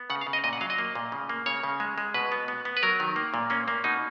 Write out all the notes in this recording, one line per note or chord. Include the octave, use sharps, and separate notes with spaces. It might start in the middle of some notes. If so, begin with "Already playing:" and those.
Already playing: B3
C#3 F#5
F5
C#3
D#5
A#2 D#5
F#5
F#3 F5
D#5
A#3
A#2
C#3
A#3
C#3 C#5
C#3
G#3
G#3
B2 B4
B3
B3
B3
B4
F#3 A#4
D#3
A#3
A#2
A#3 C#4
A#3
B2 D#4